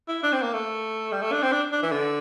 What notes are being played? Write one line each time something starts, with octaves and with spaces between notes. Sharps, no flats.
E4
D4
C4
A#3
A3
G3
A3
D4
C4
D4
D4
E3
D3